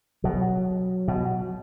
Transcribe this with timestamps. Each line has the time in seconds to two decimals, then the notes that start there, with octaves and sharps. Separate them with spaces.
0.24 B2 F#3
1.08 B2